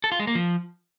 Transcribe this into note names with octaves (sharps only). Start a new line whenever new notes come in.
A4
F4
G#3
A#3
F3